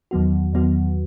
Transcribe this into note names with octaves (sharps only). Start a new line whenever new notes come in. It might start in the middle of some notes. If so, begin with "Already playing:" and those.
E2 D#3 F#3 B3 F#4
E2 D#3 F#3 B3 F#4